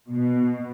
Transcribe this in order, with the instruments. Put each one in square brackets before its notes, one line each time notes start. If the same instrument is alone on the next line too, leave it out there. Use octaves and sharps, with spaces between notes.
[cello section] B2